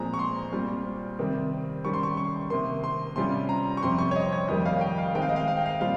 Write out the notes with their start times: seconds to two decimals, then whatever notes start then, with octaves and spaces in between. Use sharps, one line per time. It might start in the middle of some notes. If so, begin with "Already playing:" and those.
Already playing: A#2 F3 G#3 C4 A#5
0.14 C#6
0.19 C6
0.52 A#2 G3 C4 F4
1.19 C3 D#3 G3 C4
1.84 D#3 G3 C#4 C#6
1.94 C6
2.03 C#6
2.17 C#6
2.50 C3 D#3 A#3 C6
2.84 C6
3.16 C3 G3 C#4 F4 C6
3.49 A#5
3.77 C#6
3.83 F2 C3 G3 C4 C6
3.99 C#6
4.11 C#5
4.16 D#5
4.33 C#5
4.48 F2 D#3 G3 A#3 D#5
4.65 F5
4.81 G5
4.98 F5
5.14 D#3 G#3 C4 D#4 G5
5.22 F5
5.29 D#5
5.36 F5
5.48 F5
5.57 G5
5.66 F5
5.80 A#2 G3 C4 F4 F5